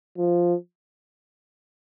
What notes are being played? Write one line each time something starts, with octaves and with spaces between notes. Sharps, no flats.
F3